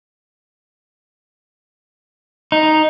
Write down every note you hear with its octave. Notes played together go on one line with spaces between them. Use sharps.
D#4